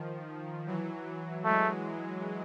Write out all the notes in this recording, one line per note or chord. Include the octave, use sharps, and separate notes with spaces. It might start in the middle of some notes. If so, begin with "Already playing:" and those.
Already playing: D#3 F3
E3 F#3
F#3 G#3 A3